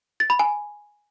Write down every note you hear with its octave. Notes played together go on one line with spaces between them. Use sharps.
A6
B5
G#5